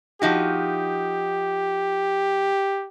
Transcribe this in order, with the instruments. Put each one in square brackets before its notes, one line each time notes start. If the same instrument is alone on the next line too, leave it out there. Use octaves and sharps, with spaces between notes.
[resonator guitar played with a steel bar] F3 D#4 F#4 [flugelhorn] G4